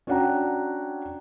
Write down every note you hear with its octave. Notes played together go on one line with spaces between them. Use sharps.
C#4 D4 F#4 F#5 G5 A#5